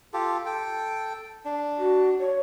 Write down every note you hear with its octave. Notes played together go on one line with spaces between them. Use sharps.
F4 G4 A4
A4 G5
D4
F#4
C#5